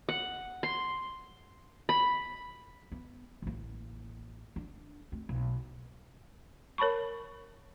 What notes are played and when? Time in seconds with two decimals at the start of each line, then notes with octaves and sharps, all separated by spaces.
0.09 F#5
0.63 C6
1.89 B5
2.92 B3
3.42 A1 A#3
4.56 D4
5.12 A3 C4
5.29 B1
6.78 A#4 C#5 A5 B5 C#6